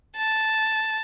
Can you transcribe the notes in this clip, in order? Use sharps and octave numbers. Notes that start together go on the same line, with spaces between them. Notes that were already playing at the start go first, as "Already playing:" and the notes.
A5